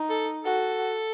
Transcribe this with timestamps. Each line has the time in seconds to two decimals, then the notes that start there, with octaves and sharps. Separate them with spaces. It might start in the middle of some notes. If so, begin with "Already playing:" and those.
Already playing: D#4
0.09 A4
0.45 F#4 A4